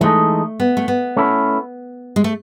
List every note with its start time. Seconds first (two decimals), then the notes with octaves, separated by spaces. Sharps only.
0.01 E3 G#3 A3 D#4 A4 D#5
0.60 B3
0.77 A3
0.88 B3
1.17 A3 C#4 E4
2.16 G#3
2.24 A3